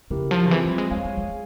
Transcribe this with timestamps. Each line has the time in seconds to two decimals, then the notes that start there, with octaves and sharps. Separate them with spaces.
0.10 C#3 E4 G4 A#4
0.31 F3
0.46 C#3
0.51 E3 C4 F4 G#4 C5
0.64 G3
0.78 G#3
0.91 G#3 G#4 C#5 F5 G#5
1.04 G#3
1.18 G#3